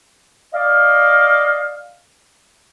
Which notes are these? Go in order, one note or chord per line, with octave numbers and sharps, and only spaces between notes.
D5 D#5 F5